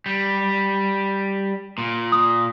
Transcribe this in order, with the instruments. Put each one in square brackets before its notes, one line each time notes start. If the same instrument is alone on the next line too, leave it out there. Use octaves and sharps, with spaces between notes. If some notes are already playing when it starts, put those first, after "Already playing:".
[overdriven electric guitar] G3
A#2
[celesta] D#6